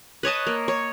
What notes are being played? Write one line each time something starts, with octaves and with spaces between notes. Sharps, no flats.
B4 C#5 D#5 A5
A#3
C#5